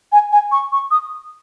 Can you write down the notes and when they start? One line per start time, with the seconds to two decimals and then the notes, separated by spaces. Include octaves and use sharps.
0.12 G#5
0.32 G#5
0.52 C#6
0.72 C#6
0.91 D#6